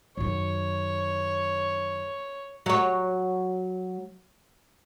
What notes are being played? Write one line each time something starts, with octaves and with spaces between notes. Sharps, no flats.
F#2 D#3 C#5
F#3 C#5